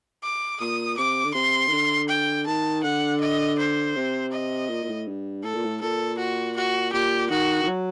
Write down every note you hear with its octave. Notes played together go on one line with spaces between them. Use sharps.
D6
A#2 D#6
C3 D6
D3
C3 C6
D#3
D3
G5
D#3 A5
D3 F#5
D#5
C5
C3
D#5
A#2
A#2
A2
G2
A2 A4
A#2
A2
A#2 A4
F#4
F#4
A#2 G4
D#3 F#4
D#3
F#3